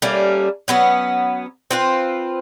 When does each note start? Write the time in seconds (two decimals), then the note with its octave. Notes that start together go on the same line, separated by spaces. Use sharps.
0.02 G3 A3 A#3 C#4
0.68 F#3 B3 C#4
1.71 C4 F4 B4